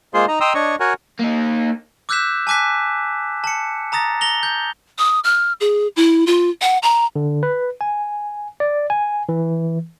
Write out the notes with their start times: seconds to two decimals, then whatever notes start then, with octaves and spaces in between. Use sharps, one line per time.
0.14 G#3 A#3 F4 G#4 C5 C6
0.28 D#4 D#5 A#5
0.41 D#5 G5 A#5 C6 D#6 E6
0.54 D4 C#5 D#5 C#6
0.80 F#4 A#4 C#5 F#5 G#5
1.19 A#3 D#4
2.09 D6 E6 F#6 G6 B6 E7
2.47 G#5 A5 D6 F#6 B6
3.44 A5 C#7
3.92 A5 A#5 D#6 A6 A#6
4.21 A#6 F7 G7
4.43 G6
4.98 D#6
5.24 F6
5.61 G#4
5.96 E4
6.27 F4
6.62 F#5
6.83 A#5
7.16 D3
7.43 B4
7.81 G#5
8.60 D5
8.90 G#5
9.29 E3